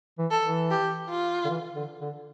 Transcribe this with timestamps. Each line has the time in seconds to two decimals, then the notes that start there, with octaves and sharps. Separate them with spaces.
0.18 E3
0.31 A4
0.44 E3
0.70 G4
1.10 F4
1.45 D3
1.49 E3
1.76 D3
2.01 D3